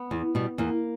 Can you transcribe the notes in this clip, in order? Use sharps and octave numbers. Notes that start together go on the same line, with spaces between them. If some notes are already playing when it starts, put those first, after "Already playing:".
Already playing: B3
E2
B2 G3
E2 A#3